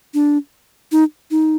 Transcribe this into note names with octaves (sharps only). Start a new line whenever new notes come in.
D4
D#4
D#4